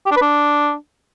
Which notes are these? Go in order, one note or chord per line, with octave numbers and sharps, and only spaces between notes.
G4
D4
B4
D4